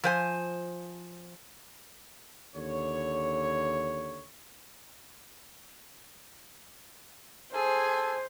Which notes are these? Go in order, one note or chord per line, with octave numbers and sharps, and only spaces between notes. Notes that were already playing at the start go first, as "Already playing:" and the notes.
F3 C5 G#5
D#2 D3 C#5
G#4 A4 C5 G#5